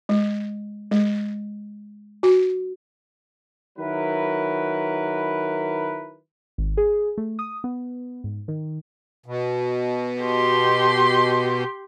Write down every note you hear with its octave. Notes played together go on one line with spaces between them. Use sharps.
G#3
G#3
F#4
D#3 F#3 E4 A#4 B4
G#1
G#4
A3
D#6
B3
G#2
D#3
B2
G4 C6